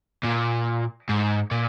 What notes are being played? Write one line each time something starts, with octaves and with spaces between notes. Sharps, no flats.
A#2
G#2
A#2